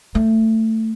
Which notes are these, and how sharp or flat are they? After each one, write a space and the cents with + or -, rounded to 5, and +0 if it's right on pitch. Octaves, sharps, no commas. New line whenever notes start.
A3 +15